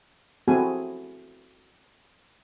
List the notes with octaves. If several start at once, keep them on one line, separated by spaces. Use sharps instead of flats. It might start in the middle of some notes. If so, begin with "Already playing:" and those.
C4 E4 F#4 G#4 A4 G#5